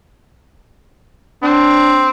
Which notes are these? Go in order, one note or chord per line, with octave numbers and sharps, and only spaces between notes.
C4 D4